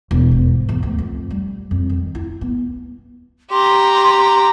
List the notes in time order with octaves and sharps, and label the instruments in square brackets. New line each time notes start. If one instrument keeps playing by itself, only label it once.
[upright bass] E1
G#2
E2
D2
F2
G3
F2
D#3
E4
B3
[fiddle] G4 A#5 [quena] C6